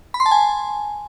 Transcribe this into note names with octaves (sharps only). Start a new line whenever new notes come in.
B5
C6
A5
G#5